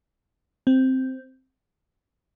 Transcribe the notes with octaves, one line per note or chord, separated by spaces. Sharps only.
C4